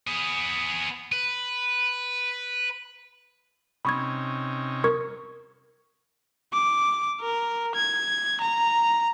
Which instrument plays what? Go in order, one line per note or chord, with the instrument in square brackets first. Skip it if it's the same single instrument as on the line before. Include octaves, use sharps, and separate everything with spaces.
[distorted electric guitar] B3 G#4
B4
[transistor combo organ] C3 C#4 D#4 [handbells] B5 C#6 G#6
[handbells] A#4 C#6 G#6
[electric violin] D6
A#4
G#6
A#5